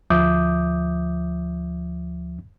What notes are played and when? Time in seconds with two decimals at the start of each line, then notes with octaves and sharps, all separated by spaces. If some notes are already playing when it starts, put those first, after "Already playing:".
0.10 D2 F3 E5 D6 D#6 G6